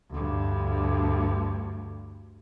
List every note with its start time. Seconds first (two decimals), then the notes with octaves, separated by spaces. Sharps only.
0.10 D2 G2